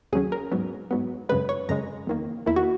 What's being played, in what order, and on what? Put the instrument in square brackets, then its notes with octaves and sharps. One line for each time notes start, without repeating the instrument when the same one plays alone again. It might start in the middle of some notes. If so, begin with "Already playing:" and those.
[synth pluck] D#2 C#3 F#3 C#4 G#4
A#4
G#2 F#3 B3
G#2 F#3 B3
F#2 C#3 G#3 B4
C#5
F#2 C#3 G#3 A#5
E2 D#3 A#3
E2 D#3 A#3 E4
F#4